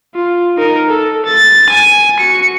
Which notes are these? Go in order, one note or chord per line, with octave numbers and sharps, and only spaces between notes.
F4
D#4 A#4
A4
A6
G#5
F#4 C#7